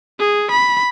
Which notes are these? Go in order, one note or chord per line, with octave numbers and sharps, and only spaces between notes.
G#4
B5